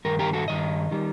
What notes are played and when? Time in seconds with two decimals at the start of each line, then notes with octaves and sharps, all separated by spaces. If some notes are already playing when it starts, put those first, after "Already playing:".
0.05 G2 D#3 A#4
0.19 G4 A#4
0.33 F#4 A4
0.48 G2 D#3 D#5
0.91 D#3 G3